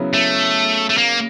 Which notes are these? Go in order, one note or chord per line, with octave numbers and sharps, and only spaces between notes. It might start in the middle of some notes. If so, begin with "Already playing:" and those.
Already playing: C#3 F#3 B3 E4
A3
A3
A#3